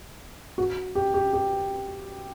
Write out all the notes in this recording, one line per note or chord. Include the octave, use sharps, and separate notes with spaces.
F#4
G4
G4
G4